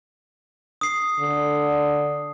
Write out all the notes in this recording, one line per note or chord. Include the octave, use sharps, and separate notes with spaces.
D#6 C7
D3